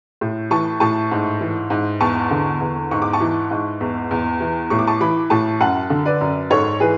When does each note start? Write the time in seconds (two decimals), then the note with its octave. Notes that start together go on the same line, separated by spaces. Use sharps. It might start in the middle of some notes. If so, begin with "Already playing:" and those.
0.21 A2
0.51 E3 A5 C#6
0.80 A2 A5 C#6
1.11 G#2
1.41 E3
1.70 G#2
2.01 E2 A5 C#6
2.31 D3
2.61 E2
2.91 G#2 C#6
3.02 D6
3.13 A5 C#6
3.20 E3
3.51 G#2
3.81 E2
4.11 E2
4.41 E3
4.70 A2 C#6
4.79 D6
4.87 A5 C#6
5.01 E3 B5 D6
5.30 A2 A5 C#6
5.60 F#2 F#5 A5
5.90 D3
6.05 B4 D5
6.21 F#2
6.50 G#2 A4 C#5
6.80 E3 G#4 B4